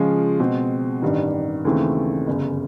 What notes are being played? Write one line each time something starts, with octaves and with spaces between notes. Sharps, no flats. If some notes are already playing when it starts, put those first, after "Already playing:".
Already playing: C#3 F3 G#3 C#4 F4
B2 G#3 C4
A1 G2 D#3 G3
D#2 C#3 E3 A3 C4
G1 F#2 C#3